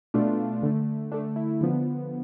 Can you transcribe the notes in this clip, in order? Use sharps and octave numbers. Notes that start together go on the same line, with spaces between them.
B2 A3 D4 F4
D3 A3
D3 A3 D4
E4
D3 F3 B3